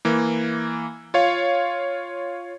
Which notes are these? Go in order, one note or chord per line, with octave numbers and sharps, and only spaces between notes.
E3 A#3
F4 C#5 F5